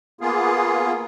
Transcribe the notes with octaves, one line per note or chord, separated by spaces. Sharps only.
A#3 B3 F4 G#4